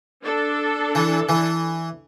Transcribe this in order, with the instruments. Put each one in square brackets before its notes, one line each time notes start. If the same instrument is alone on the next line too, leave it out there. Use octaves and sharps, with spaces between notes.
[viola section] D4 A4
[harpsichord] E3
E3